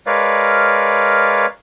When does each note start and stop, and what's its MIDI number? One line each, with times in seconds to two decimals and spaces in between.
0.07 1.46 56
0.07 1.46 70
0.07 1.46 71
0.07 1.46 73
0.07 1.46 74
0.07 1.46 77